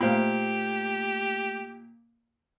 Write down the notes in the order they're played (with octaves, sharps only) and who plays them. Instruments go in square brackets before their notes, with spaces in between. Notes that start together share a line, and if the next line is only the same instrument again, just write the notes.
[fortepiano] A#2 F5 [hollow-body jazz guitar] A3 C5 B5 [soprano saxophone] G4